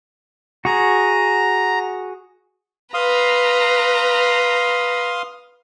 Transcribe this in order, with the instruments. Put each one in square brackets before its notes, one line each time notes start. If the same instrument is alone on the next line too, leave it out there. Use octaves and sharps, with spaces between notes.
[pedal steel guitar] F#4 G#4 [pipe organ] A#5
[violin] B4 A#5 [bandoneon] F5 C6 D#6